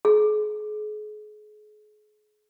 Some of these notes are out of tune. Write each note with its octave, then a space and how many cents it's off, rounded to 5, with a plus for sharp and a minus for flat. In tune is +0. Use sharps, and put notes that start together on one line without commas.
G#4 +35